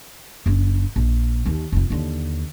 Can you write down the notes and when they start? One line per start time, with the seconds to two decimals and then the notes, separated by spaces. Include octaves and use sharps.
0.46 F#1 D4
0.96 A#1
1.45 D#2 D#3
1.72 F1 F4
1.90 D#2 D3